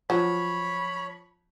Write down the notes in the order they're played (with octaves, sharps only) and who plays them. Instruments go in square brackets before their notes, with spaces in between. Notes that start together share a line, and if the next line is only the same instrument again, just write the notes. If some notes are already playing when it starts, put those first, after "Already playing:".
[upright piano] F3 [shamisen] F#3 [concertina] C#5 [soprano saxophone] B5